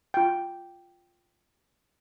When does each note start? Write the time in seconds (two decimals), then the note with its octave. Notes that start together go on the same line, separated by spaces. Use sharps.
0.14 F4 G5